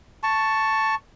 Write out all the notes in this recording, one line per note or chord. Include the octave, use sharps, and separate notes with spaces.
A5 C#6